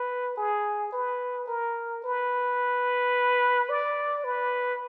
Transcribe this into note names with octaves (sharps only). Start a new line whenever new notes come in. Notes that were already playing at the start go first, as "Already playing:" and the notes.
Already playing: B4
G#4
B4
A#4
B4
D5
B4